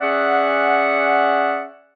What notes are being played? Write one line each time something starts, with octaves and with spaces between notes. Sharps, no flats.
C#4 G#4 D5 E5 F#5